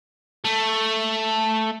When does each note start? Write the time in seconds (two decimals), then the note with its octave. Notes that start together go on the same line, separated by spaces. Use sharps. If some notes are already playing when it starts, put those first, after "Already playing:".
0.45 A3